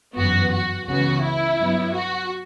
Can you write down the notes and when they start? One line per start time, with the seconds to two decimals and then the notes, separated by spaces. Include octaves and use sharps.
0.15 G1 F#2 E3 B3 F#4
0.51 F#4
0.87 C#2 C#3 E3 B3 F#4
1.22 E4
1.58 G2 F#3 B3
1.94 F#4